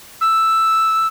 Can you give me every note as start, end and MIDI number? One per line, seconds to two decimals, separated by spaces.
0.21 1.06 88